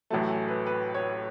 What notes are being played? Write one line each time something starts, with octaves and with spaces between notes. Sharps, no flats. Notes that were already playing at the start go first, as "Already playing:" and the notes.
A1 A2 F#3 A3 A5
G#5
B4
B4
C#5